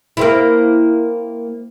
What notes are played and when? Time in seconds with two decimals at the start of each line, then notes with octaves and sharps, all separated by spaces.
0.17 A#3 C4 E4